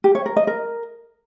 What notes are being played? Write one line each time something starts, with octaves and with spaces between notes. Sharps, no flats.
G4
C#5
A#4
D#5
A#4